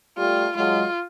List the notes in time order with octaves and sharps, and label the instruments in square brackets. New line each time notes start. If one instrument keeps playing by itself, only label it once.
[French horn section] G3 A3 [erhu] F4
[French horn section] F#3 G#3 [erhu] F4